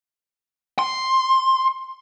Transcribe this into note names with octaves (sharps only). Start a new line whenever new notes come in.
C6